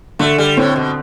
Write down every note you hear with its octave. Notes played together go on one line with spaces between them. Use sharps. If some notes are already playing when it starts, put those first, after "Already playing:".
D3 A3
G3
A2 C4
B2